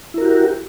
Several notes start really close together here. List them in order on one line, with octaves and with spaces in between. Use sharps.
E4 A#4 F#4 G4